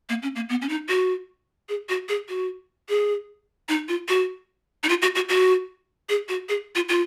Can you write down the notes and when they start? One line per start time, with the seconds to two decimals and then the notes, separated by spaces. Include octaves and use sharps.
0.09 A#3
0.22 C#4
0.36 A#3
0.49 B3
0.62 C#4
0.69 D#4
0.89 F#4
1.69 G#4
1.89 F#4
2.09 G#4
2.29 F#4
2.89 G#4
3.69 D#4
3.88 F4
4.09 F#4
4.83 D#4
4.89 F4
5.02 F#4
5.15 F#4
5.29 F#4
6.09 G#4
6.29 F#4
6.49 G#4
6.75 F4
6.89 F4